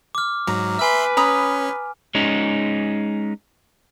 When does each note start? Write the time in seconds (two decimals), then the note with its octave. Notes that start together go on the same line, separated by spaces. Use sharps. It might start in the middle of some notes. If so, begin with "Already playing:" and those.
0.15 D6 F6
0.47 G#2 F#3 A#5
0.79 B4 E5 G#5 B5 C6 F6
1.17 C#4 A#5 B5 D#6
2.15 G#3 C#4 D#4